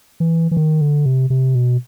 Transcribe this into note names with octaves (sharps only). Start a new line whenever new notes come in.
E3
E3
D#3
D3
C3
C3
B2